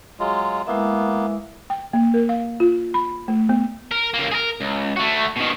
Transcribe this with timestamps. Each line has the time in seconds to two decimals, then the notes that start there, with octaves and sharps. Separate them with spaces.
0.20 F#3 G#3 F4
0.67 G#3 A#3 B3 E4 E5
1.70 G5
1.93 A#3
2.14 A#4
2.29 F5
2.60 F4
2.94 B5
3.28 A3
3.49 B3
3.92 A#4
4.14 C#2 A#3
4.32 G#4 A#4
4.60 C#2
4.96 A3 F#4
5.36 B2 D#3